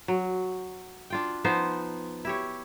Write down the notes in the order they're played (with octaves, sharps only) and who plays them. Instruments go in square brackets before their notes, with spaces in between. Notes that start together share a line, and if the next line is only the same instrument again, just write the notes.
[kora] F#3
D4 F4 G5
F3 B3 D#4 C5
E4 G4 C#5